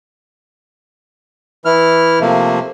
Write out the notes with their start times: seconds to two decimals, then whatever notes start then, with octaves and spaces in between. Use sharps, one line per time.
1.65 E3 E4 F6
2.21 C3 F3 A3 A#3